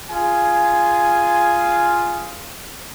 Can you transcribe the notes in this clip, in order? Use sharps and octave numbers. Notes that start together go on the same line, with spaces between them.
F4 G#4 G#5